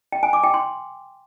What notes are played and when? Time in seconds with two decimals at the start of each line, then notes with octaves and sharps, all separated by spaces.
0.12 G5
0.23 G#5
0.33 D6
0.44 G5
0.54 C6